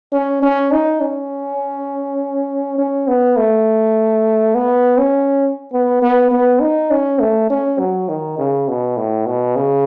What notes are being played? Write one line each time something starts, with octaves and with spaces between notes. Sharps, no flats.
C#4
C#4
D#4
C#4
C#4
B3
A3
B3
C#4
B3
B3
B3
D#4
C#4
A3
C#4
F#3
D#3
C#3
B2
A2
B2
C#3